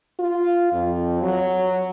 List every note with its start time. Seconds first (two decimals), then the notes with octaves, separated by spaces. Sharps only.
0.19 F4
0.73 F2
1.23 F#3